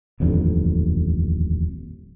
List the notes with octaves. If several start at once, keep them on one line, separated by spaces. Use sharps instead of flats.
D#1 A1 F2 D3